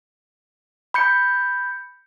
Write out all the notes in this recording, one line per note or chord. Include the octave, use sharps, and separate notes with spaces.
B5 G6 C#7